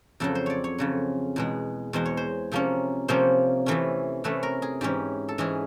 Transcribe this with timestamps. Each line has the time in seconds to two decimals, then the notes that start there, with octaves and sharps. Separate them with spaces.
0.20 F2 C#3 F#3 A4
0.35 C5
0.46 C#5 D5
0.64 C#5
0.78 F2 C#3 F#3
1.36 E2 B2 G#3
1.93 E2 B2 G#3 C5
2.06 C#5
2.17 C5
2.52 C3 F3 A#3 C#4
3.08 C3 F3 A#3 C#4 C5
3.66 C3 E3 A3 C#4
4.24 C3 E3 A3 C#4 B4
4.43 A#4
4.62 G#4
4.81 G#2 E3 G#3 C#4 G4
5.29 A4
5.38 G#2 E3 G#3 C#4 G#4